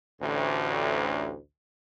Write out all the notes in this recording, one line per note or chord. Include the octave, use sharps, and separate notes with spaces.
A1 D2